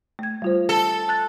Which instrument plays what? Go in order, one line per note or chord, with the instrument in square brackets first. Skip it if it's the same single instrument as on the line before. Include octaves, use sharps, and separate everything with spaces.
[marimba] A3 G#6
G3 F4 C5
[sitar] A4
[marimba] A5 F#6 A6